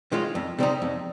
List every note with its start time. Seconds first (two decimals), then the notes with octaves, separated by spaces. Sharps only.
0.12 D#3 G#3 C#4 F4
0.35 F2
0.59 C3 G3 C4 D#4
0.82 F2